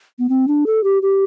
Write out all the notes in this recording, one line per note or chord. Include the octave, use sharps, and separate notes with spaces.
B3
C4
D4
A4
G4
G4